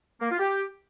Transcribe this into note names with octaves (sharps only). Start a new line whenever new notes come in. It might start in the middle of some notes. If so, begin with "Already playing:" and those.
A#3
F4
G4